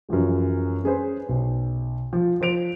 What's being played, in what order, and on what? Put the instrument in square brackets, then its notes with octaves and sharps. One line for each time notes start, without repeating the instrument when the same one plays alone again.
[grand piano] F#2 E3 F3 G#3
C#4 G#4 B4 C5
B1
F3
F3 C5 D7 F7